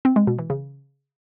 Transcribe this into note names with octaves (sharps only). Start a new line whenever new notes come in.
C4
G#3
B2
E3
C#3